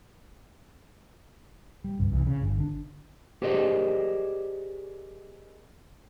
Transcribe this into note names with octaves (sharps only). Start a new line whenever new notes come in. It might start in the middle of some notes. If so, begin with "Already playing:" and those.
G3
C#2 G2
C2 E3
C#3
G1
D3 D4
G4 G#4 A#4 C5 D5 D#5